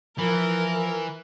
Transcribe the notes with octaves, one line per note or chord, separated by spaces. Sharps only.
E3 F3 A#4